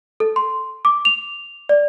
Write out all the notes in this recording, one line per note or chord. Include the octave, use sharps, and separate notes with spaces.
A4
C6
D6
F7
D5